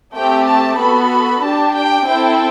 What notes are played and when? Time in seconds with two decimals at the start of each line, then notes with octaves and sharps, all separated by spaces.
0.14 A3 C4 G4 G5
0.47 A5
0.79 B3 F#4 A4 B5
1.43 D4 G4 A5
1.75 G5
2.07 C4 E4 A4 G5